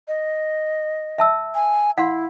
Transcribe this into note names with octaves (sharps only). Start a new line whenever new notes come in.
D#5
E5 A5 E6
G#5
E4 F5 F#5 C6